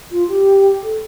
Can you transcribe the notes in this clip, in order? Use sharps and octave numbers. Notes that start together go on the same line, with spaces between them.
F4
G4
A4